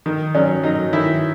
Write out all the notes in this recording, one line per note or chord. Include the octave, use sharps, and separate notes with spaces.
D#3
F#3 C#4
F#3 D#4
D#3 E4